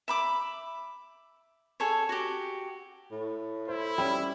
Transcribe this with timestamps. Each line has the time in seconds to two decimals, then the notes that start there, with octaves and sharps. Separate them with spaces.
0.08 E5 B5 D6
1.80 G#4 A4 C#5
2.09 F#4 G4
3.11 A2
3.68 E4 C5
3.98 G3 C#4 B5